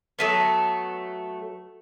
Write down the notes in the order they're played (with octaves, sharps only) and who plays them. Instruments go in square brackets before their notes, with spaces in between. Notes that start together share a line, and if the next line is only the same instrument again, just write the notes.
[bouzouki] F#3 A3 B3